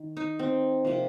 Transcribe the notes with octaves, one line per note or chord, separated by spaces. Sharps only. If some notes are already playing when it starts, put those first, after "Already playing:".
Already playing: D#3
D#4
C4
C3 F3 A#3